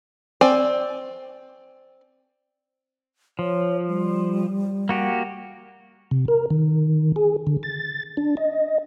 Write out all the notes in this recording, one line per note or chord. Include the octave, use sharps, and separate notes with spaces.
C4 D5 G#5
F3 C#5
G3
A#3 F#4 G4
C3
A#4
D#3
G#4
D3
A6
D4
D#5